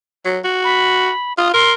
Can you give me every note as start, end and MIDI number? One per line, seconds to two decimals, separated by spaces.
0.25 0.39 54
0.44 1.10 66
0.64 1.33 83
1.38 1.51 65
1.38 1.49 87
1.54 1.74 70
1.54 1.73 84